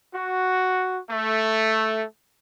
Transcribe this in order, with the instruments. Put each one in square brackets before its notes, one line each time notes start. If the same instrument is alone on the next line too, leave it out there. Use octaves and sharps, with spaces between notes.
[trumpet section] F#4
A3